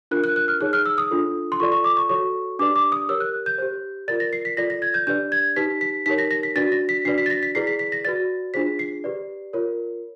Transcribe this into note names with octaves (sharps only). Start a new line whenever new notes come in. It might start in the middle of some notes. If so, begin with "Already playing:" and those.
D4 F4 A#4 F#6
F#6
F#6
F6
D#4 G#4 C#5 F#6
F6
E6
D#6
D4 F4 A4
C6
F4 A4 D5 C#6
C#6
D6
C#6
F#4 A4 C#5 C#6
D4 G4 B4 D5 D6
D6
D#6
G4 A#4 C#5 E6
F#6
G6
G4 C5
F4 A#4 D5 A6
A#6
C7
B6
F4 A4 D5 A#6
A#6
G#6
G6
D4 G4 B4 D5 G6
G#6
D#4 G4 B4 B6
B6
D#4 G4 A#4 C#5 B6
A#6
A#6
B6
D4 F#4 B4 D5 A6
A#6
B6
D4 F#4 B4 D5 C7
B6
A6
A#6
B6
E4 G#4 B4 D5 C7
B6
B6
A#6
F#4 B4 D5 A6
D4 F4 G#4 C5 B6
C7
G4 B4 D5
F4 A#4 C#5